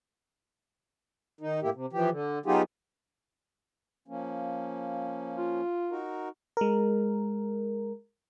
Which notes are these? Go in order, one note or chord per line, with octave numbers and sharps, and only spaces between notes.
D#3 D#4
A2 A#3 E4 G4
C3
E3 F3 G4
D3
F#3 B3 D#4 F4 G4 G#4
F3 A#3 C#4
F4
D#4 F#4 A#4
G#3 A#4